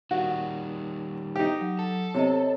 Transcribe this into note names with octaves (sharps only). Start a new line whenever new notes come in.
D#3 G3 F#4
D#4 G4
F#3
A4
C3 C#5 D#5